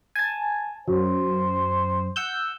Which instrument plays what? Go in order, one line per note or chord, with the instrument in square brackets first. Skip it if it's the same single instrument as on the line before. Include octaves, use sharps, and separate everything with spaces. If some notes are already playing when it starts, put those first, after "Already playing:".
[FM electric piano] G#5 A5
[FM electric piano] F#2 [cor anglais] C5
[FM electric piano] F#5 E6 G6